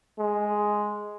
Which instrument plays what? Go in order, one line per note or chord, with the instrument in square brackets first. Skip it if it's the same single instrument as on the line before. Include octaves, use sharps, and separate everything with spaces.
[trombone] G#3